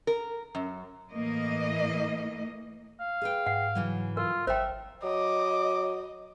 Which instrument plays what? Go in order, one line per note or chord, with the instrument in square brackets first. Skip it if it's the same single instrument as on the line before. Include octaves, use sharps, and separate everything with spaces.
[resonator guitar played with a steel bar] A#4
F#2
[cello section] A2 E3 A#3 D#5
[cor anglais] F5
[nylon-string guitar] G#4 B4 G5
[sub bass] G#2 [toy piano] F#5
[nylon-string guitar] C#3 E3 F#3
[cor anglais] F4 [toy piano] A#4
[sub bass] G#1 [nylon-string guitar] A#4 [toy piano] C5 G5 [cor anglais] E5
[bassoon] F#3 [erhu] D#5 [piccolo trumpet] D6